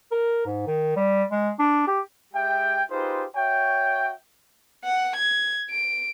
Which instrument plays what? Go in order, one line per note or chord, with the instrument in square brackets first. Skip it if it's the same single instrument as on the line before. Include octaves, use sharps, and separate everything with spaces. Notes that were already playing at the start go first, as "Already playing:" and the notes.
[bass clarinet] A#4
G#2
D#3
G3
G#3
D4
G4
[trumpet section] G#3 G4 E5 G5
D#4 F4 G4 G#4 B4 C5
F#4 C#5 E5 G5
[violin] F#5
G#6
D7